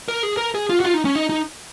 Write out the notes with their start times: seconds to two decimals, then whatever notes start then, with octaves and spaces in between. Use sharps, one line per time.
0.08 A#4
0.23 G#4
0.37 A#4
0.55 G#4
0.70 F4
0.80 F#4
0.84 F4
0.94 D#4
1.05 C#4
1.15 D#4
1.29 D#4